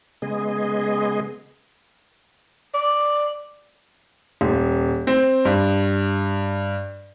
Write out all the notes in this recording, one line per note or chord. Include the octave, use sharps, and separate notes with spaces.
C#3 G#3 B3 G#4 D#5
D5
D#1
C4
G2